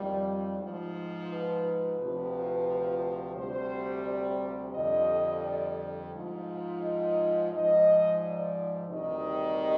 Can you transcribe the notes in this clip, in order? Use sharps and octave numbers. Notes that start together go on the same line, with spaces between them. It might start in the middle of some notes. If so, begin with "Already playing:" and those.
Already playing: F2 D#3 G3
G#2 F3
B4
D2 C3 F3
D2 C3 G3 C5
D5
F2 D3 G3 D#5
D5
G#2 F3
D#5
G#2 F3 D#5
D5
D2 C3 D#3 G3 D#5